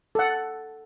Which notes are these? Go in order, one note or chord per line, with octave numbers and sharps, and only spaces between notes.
A4 F#5